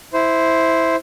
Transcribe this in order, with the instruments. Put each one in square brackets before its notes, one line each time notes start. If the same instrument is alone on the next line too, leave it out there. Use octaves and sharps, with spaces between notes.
[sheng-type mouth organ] E4 C5